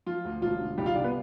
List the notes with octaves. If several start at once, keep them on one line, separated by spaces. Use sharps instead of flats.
F3 F4
D2
E1 F4
D3
C2 G3 G4
F4 F5
C3 D4 D5
B3 B4